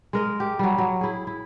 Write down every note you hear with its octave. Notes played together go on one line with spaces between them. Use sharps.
G#3 A#4 D#5
G4
F#3 G3
F#3
E4 G#4
E4